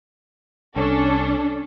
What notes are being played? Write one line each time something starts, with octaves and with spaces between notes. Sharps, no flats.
C2 C#4 D4 A4